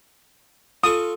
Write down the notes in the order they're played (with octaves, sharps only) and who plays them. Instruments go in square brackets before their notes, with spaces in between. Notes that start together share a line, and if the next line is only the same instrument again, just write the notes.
[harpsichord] F4 A4 C#6 [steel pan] D#6